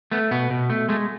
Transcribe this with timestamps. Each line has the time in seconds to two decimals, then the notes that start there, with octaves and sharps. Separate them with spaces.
0.11 A3 B3
0.31 B2 B3
0.50 B2
0.70 A3
0.89 G#3 A3